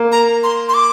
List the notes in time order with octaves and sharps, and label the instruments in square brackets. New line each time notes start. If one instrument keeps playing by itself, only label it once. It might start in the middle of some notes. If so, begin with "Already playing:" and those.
Already playing: [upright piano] A#3
[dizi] A#5
C6
C6
D6